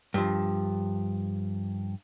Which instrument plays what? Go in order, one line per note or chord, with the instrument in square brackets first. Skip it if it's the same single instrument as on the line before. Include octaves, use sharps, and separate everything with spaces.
[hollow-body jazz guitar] G2 F3